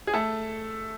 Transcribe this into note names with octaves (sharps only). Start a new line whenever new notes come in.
G#4
A3 A4